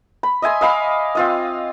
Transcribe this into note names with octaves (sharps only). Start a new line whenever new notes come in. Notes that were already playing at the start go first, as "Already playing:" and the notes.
B5
D#5 E5 G#5 C6
D#5 F5 B5 D6
C4 F4 D#5